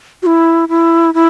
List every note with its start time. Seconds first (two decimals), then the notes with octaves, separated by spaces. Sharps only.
0.23 F#4
0.26 E4
0.69 E4
1.14 E4